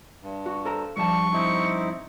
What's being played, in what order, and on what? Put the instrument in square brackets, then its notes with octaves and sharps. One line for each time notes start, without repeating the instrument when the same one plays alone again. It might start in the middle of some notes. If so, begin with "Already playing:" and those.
[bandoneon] G2
[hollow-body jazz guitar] F#4
A4 C5 A#5
[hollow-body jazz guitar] G2 F3 A5 [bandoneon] G3 [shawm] C#6
[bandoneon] C4 D#4 E4